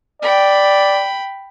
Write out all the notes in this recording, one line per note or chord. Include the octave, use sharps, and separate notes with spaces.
D5 G5 B5